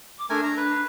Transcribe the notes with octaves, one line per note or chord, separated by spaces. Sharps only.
D6
A3 D4 A#4 G#5
A#5
B4